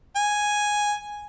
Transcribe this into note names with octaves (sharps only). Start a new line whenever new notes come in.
G#5